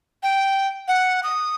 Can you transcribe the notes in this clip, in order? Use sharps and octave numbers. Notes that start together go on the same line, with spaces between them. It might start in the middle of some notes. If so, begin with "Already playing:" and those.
G5
F#5
D#6